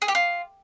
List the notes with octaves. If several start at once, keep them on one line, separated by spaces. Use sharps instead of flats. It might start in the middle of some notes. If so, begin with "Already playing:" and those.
G#4
G4
F4